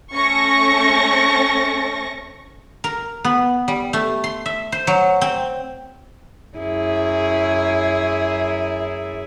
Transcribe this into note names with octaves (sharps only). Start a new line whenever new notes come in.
A3 C#4 C#6 A#6
A#4
B3
G3
A3
C6
E5
C5
F#3
C4
F#2 E4 G#4